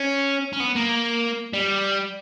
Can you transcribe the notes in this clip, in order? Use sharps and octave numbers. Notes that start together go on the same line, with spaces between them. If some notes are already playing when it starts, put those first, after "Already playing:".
Already playing: C#4
C#4
B3
A#3
G3